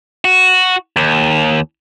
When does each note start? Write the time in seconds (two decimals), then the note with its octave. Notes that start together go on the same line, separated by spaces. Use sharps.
0.25 F#4
0.96 D#2